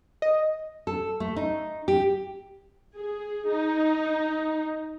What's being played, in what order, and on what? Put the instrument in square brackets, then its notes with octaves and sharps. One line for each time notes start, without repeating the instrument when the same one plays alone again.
[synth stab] D#5
[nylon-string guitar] A4
A3
D#4
G4
[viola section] G#4
D#4